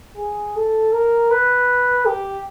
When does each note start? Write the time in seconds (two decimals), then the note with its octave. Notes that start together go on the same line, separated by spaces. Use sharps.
0.17 G#4
0.56 A4
0.93 A#4
1.31 B4
2.06 G4